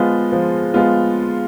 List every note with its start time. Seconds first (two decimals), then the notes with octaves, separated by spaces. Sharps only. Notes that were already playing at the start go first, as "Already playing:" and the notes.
Already playing: F3 G#3 B3 F4
0.32 F3
0.74 G#3 B3 F4